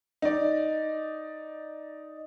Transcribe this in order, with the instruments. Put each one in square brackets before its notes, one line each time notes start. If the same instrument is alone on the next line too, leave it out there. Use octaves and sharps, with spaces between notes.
[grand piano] D#4 D5